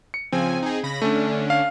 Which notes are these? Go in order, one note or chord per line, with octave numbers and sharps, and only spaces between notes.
C#7
C#3 F3 C4 G#5
D#4 G#4
C#3 B5 A#6
D3 A3 C#4 D4
F5